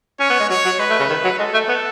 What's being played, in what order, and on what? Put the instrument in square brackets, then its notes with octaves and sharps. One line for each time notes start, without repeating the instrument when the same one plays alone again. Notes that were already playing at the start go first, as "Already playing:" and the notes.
[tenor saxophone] C#4 [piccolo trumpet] C#5
[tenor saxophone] B3
G#3
[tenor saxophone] F#3 [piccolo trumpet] C#5
[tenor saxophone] F#3
[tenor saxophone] G#3 [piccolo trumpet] B4
[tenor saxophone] A3
C#3
D#3
F#3
[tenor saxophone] G#3 [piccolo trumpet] A4
[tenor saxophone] A3
B3